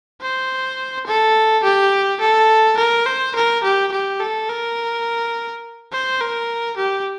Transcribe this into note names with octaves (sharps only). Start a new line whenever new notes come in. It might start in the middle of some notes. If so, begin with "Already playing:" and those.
C5
A4
G4
A4
A#4
C5
A#4
G4
G4
A4
A#4
C5
A#4
G4